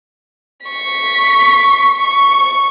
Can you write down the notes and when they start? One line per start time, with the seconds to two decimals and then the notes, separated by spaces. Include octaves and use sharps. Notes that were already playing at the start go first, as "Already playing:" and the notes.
0.66 C#6 B6
1.97 C#6